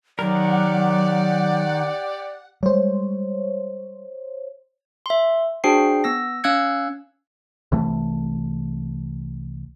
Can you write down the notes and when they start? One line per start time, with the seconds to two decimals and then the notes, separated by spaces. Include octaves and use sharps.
0.19 D#3 F#3 G4 A#4 D5 F#5
2.63 G3 G#3 C5 C#5
5.06 E5 C6
5.64 D4 F#4 G#4 C5 G5 C7
6.04 B3 E6 A#6
6.44 C#4 F5 E6 F#6 G#6 C#7
7.72 C2 E3 A3